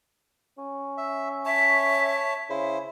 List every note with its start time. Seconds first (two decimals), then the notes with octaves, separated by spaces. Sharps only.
0.58 C#4
0.98 E5
1.46 C#5 E5 A5
2.50 C#3 E4 C5